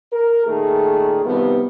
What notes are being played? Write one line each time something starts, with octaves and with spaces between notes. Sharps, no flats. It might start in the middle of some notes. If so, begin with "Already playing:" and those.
A#4
A#2 D#3 A3 G#4
C3 D#3 F3 G3 B3